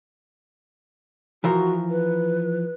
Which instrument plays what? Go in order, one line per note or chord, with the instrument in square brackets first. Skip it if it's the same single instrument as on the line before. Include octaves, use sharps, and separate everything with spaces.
[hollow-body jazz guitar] E3 F3 A#4 [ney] F#4
[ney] B4